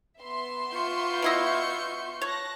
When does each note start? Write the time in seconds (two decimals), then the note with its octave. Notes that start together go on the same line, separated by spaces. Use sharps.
0.19 B3 E5 C6
0.72 F4 C#6 G6
1.22 B2 E4 D#5
2.22 C#5 A5 F#6 A#6